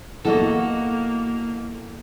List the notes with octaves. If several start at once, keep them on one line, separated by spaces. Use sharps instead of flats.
E2 A#3 F#4 A4 D#5 F#5